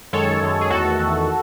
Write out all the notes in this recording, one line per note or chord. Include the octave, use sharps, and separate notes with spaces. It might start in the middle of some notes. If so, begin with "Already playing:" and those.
F#2 D#3 G#3 A4 C#5
F#2 D#3 G#3
G#4
E2 D#3 A3 F#4 A4
E2 D#3 A3